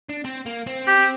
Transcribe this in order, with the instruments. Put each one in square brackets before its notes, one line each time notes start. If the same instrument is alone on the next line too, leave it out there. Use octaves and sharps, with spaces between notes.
[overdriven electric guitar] D4
C4
A#3
C4
[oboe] G4